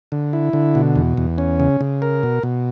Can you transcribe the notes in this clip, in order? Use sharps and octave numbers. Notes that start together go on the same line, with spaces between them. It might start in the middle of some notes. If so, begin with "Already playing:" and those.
D3
E4
D3
B2
E2
E2
C#4
C#3
C#3
A#4
B2
B2